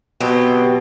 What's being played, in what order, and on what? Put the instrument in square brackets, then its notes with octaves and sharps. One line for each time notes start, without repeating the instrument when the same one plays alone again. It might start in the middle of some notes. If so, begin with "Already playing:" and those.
[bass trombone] B2 [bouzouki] F#3 C4 G4